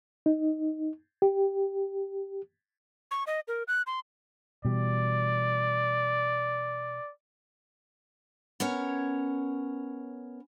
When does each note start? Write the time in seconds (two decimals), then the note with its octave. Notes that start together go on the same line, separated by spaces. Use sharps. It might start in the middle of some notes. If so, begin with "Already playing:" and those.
0.26 D#4
1.22 G4
3.11 C#6
3.27 D#5
3.48 A#4
3.68 F#6
3.87 C6
4.65 B2 E3 G3 D5
8.60 B3 C#4 A#4 C#5